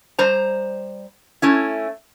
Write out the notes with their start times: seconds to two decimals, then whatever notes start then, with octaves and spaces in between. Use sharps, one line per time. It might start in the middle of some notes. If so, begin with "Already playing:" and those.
0.19 G3 C5 A#5
1.42 A3 C#4 E4